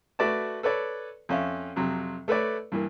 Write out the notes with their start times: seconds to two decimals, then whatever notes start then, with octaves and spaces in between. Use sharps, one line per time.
0.19 A3 F#4 B4 D5 E5 A5
0.63 A4 B4 C#5 D5
1.29 F2 C#4 E5 F5
1.76 F2 C3 F#3
2.28 A3 A4 B4 C#5 D5
2.72 G2 E3 A#3